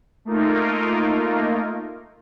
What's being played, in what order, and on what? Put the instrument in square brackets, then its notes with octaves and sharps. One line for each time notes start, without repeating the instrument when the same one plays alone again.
[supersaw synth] A3 A#3 D#4 F4 A#4